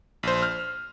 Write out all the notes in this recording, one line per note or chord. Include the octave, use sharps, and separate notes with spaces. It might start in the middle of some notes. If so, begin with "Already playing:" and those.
A#1 C5
F6